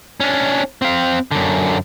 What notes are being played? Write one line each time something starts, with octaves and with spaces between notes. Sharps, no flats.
C#4 D4
C4 F5
F#2 D3